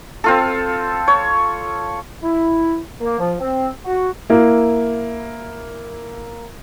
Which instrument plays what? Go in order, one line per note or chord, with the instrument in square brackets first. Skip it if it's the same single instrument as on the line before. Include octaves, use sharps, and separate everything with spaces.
[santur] C4 F4 A4
C#5
[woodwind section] E4
A#3
F3
C4
F#4
[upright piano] A#3 E4